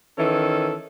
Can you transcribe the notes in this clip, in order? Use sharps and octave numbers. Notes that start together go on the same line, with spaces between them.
D#3 E3 C#4 A4